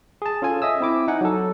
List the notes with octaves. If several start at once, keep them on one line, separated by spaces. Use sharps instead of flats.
G#4 A5
C#4 F4 A4 G#5
D#5 E5 D#6 E6
C4 E4 D6
D#4 F#5 G#5
F#3 A4